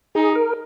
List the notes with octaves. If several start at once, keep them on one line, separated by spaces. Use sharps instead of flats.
D#4 G#4
A#4